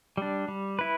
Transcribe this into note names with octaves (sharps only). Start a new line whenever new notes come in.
G3 D4
G3
E4 B4